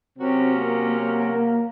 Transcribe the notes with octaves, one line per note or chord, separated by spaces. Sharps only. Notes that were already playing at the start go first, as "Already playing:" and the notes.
C3 F#3 C4 C#4 F#4 A#4
A#3
A#3
A#3